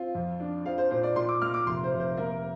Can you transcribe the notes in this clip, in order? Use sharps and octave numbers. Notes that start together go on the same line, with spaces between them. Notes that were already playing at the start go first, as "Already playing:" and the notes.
Already playing: C4 F4
F2
D4
F3 F5
C5
A#2 C5
D5
A#2 C6
D6
A#3 F6
D6
F1 C6
C5
F1
C5
A#3 A#4